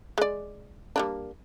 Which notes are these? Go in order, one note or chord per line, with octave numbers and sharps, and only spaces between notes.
G#3 D5
G3 A#3 D4